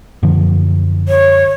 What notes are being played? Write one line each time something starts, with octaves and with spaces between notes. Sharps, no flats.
F#2 D3 F3
C#5